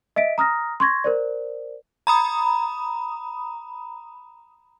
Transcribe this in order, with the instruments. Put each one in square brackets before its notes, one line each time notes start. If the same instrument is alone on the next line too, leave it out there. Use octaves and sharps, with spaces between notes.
[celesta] D#5 E5 B6 D7
A#5 D#6 F6 A#6
C6 C#6 G#6 A#6
A#4 C5 D5
[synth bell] A#5 B5 D#6